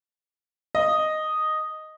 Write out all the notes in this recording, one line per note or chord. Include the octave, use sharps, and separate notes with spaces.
D#5